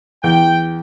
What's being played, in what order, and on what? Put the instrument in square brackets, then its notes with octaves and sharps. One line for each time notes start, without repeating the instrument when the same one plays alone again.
[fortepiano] E2 [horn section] G5